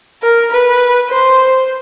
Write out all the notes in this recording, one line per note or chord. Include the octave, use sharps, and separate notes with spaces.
A#4
B4
C5